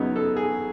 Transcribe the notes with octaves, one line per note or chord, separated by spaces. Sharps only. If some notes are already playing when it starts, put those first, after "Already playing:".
Already playing: F#2 C#3 F#3 B3 D#4
A4
G#4